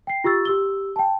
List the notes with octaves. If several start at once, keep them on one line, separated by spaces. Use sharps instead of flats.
G5 C7
F4 G4 C#6 E6 A6
G4 E6 G7
G5 A5